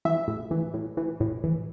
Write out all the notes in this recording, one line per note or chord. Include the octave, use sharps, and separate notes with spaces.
E3 E5
A2
E3
A2
E3
A2
E3